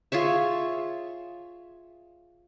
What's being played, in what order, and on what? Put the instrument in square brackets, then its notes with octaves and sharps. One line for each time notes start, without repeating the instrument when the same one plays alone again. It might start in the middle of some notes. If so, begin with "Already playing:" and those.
[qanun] F4 G#4 C#5 E5